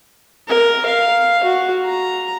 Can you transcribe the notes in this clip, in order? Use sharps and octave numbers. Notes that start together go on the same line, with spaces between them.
A#4
F5
F#4
A#5